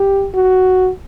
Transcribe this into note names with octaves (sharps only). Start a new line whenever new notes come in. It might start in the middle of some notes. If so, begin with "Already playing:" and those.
Already playing: G4
F#4